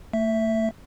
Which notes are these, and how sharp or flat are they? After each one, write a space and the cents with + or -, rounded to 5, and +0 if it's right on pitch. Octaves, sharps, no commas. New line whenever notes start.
A3 +35 E5 +0